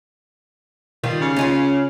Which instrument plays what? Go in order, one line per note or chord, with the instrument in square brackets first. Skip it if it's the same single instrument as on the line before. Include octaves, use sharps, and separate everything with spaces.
[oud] D#3 G3 F4
[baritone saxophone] C#3
[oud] C#4 D#4 F4